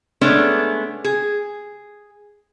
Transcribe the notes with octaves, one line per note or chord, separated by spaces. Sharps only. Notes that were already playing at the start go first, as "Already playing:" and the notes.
G#3 A3 B3 C#4 D4
G#4